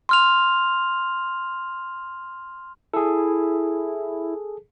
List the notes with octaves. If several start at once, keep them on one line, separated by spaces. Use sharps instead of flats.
C6 F6 F7
E4 G#4 A4